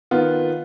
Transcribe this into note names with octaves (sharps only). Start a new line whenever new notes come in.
D#3 B3 F4